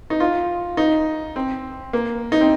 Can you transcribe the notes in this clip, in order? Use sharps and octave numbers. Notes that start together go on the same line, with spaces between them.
D#4
F4
D#4
C4
A#3
D#4
C4